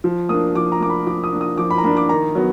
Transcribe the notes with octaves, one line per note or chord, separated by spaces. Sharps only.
F3
A#3 D4 D#6
F3 D6
A#5
A#3 D4 B5 D6
F3 D6
D#6
A#3 D4
D#6
F3 D6
B5
A#5
A#3 D4 B5
D6
D#3 A#5
F#3 B3